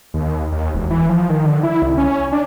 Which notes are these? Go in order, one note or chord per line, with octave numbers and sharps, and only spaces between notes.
D#2
D#2
E1
E3
F3
D#3
D3
E4
C2
C#4
D4